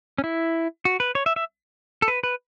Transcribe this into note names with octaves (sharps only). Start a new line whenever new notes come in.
C#4
E4
F#4
B4
C#5
E5
E5
A4
B4
B4